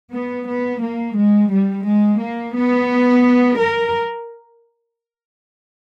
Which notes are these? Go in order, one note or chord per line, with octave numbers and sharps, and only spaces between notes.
B3
B3
A#3
G#3
G3
G#3
A#3
B3
A#4